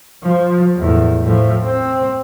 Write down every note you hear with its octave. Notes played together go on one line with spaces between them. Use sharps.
F3
E2 A2
A2 F3
C4